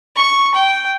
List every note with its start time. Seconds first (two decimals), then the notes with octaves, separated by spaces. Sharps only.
0.16 C#6
0.54 G5